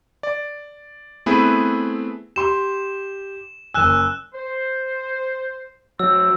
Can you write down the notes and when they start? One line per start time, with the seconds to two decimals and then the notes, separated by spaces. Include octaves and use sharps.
0.23 D5
1.26 A3 B3 C4 E4 G#4 B4
2.36 G4 C6 E7
3.74 F#1 G#5 E6 F#6 E7
4.34 C5
5.99 G#2 F#3 A3 C4 E6